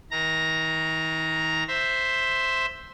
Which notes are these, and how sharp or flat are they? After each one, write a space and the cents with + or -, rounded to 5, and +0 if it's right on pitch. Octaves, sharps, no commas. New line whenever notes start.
D#3 +45 A#5 +0
C5 +0 E5 +0